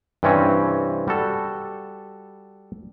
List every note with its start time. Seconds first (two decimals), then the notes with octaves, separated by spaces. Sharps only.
0.23 G2 C3 E3 C4 C#4
1.08 G3 F#4 A4